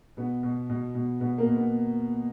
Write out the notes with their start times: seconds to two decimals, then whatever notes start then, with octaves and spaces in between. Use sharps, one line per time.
0.17 B2 B3
0.43 B2
0.70 B2
0.95 B2
1.21 B2 B3
1.38 A#3
1.47 B2
1.56 B3